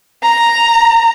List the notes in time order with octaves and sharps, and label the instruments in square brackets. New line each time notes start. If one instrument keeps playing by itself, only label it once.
[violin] A#5